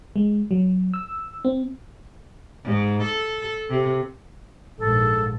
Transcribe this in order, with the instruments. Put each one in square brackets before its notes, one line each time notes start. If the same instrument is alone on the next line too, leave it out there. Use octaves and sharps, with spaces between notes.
[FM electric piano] G#3
F#3
E6
C4
[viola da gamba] G#2
A4
C3
[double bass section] A#1 G#2 [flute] A4